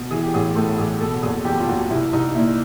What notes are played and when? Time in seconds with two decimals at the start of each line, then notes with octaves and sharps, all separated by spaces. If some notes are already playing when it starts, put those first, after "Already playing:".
Already playing: B2
0.11 E3 G#4
0.23 G4
0.34 A1 G#4
0.56 A2 A4
0.78 A1 G#4
1.00 B2 A4
1.23 F#1 G#4
1.45 E2 G4
1.59 F4
1.68 F#1 F#4
1.90 C2 E4
2.13 C2 D#4
2.35 A#2 E4